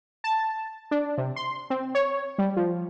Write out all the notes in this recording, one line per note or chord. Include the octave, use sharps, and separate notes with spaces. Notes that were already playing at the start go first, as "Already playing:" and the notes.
A5
D4
C3
C6
C4
C#5
G3
F3